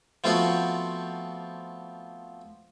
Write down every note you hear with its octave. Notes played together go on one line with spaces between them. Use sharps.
F3 A3 B3 C4 F4 F#4